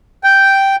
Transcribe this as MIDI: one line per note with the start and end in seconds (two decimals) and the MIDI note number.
0.24 0.76 79